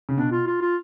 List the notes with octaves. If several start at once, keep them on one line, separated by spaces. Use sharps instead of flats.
C#3
B2 D4
F4
F4
F4